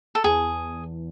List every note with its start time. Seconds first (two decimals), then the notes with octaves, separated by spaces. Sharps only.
0.15 A4
0.24 E2 G#4